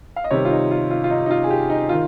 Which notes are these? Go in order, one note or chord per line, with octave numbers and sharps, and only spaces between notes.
F5
D#5
C3 D#3 G3 C#5
F4
D#4
F4
F4
F4
D#4
D#4
F4
G#4
G4
D#4
D#3 F4